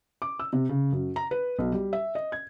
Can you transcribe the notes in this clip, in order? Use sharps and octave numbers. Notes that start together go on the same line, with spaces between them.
D6
E6
C3
C#3
F#2
A#5
B4
B1
G3
E5
D#5
G#6